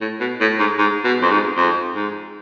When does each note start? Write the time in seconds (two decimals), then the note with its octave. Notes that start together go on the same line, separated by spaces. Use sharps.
0.01 A2
0.20 B2
0.41 A2
0.59 G#2
0.78 G#2
1.04 B2
1.22 F2
1.31 G#2
1.57 F2
1.95 G#2